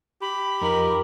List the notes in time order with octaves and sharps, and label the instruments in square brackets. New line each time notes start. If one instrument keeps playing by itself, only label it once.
[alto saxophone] G4 [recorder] B5
[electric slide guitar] F2 D#4 [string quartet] A#4